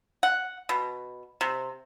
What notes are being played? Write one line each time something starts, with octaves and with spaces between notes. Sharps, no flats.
F#5
B2
C3